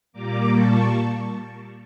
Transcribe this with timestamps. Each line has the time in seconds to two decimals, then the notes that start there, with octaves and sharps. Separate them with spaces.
0.13 A#2 G3 A#3 A#5 D6
0.52 A5 C#6